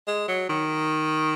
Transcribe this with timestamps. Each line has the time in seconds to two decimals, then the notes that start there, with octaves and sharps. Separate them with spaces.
0.08 G#3
0.28 F#3
0.49 D#3